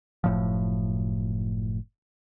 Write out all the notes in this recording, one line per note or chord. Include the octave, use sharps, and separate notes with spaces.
F#1 A2 F3